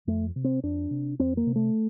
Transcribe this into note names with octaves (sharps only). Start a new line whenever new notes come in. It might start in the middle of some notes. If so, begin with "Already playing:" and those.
F2 A3
C3
C4
F2 D4
C3
F2 C4
A#3
C3
A3